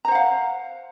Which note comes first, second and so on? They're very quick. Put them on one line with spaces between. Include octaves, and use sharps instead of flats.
A#5 C5 F#5 F5